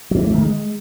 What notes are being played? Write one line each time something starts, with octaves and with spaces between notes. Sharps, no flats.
F#3
E3
A3
D#3
G#3